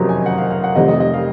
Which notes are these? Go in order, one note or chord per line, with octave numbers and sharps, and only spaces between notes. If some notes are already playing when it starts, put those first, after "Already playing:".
Already playing: F#1 F2 C3 F#3 A#5
G#5
F#5
F5
F5
F#5
F1 F2 C3 D#5
D#5
D#5
F5